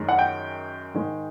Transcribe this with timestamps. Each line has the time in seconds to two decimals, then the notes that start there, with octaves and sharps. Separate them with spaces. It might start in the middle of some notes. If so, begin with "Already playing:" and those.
Already playing: F#2 D#3 G#3
0.09 F#5
0.19 G5
0.94 G#2 D#3 G#3